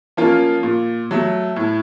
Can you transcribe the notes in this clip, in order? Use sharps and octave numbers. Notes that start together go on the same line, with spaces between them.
F3 A#3 C#4 F4
A#2
F#3 A3
A2